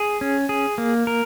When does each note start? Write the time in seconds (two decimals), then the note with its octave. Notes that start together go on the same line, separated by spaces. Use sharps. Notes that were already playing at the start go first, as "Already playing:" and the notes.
Already playing: G#4
0.21 C#4
0.49 G#4
0.78 A#3
1.07 A#4